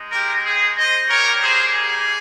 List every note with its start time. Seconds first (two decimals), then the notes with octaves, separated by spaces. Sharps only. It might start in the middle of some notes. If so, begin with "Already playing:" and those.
Already playing: G#3 D#4
0.12 G4 A#4
0.44 G#4
0.76 C5 D#5
1.09 G3 A#3 D#4 G4 A#4 C#5
1.41 G#4 C5
1.73 G#4